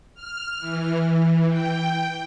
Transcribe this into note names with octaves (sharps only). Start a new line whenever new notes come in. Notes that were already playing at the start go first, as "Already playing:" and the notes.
F6
E3
G5